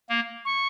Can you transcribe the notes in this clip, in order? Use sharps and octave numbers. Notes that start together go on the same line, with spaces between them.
A#3
C#6